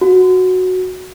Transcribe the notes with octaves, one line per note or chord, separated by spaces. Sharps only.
F#4